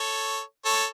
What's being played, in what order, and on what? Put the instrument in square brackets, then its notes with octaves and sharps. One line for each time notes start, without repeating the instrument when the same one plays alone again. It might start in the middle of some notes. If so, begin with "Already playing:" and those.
Already playing: [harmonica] A4 C#5
A4 C#5